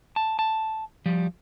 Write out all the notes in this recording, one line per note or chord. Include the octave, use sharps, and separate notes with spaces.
A5
A5
F3 G3